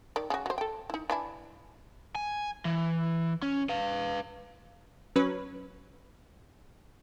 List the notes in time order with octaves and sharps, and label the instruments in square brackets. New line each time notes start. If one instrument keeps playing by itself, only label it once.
[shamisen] D#3 D5
C#3 F#4
F#3 C5
A4 G5
D#4 E4
E3 D4 E4
[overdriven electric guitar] G#5
E3
C#4
B4 F5
[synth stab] F#3 C#4 B4